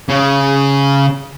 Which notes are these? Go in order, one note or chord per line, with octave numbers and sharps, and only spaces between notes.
C#3